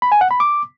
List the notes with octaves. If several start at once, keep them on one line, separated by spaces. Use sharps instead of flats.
B5
G#5
F#5
B5
D6